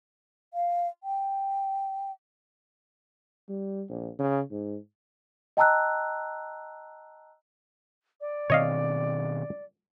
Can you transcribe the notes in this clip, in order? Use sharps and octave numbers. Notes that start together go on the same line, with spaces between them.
F5
G5
G3
A#1
C#3
G#2
D#5 G5 A5 A#5 E6 F#6
D5
B2 D#3 C4 C#5 D#5 F5